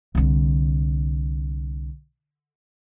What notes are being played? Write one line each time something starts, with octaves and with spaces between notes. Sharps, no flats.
C2 D3